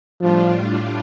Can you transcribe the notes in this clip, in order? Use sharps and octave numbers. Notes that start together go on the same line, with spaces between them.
A2 F3 G3 D4 F4